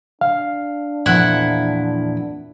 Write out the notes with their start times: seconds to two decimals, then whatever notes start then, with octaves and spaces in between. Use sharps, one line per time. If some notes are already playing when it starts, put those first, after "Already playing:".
0.21 D4 F5
1.06 E2 A#2 F3 E4 F#5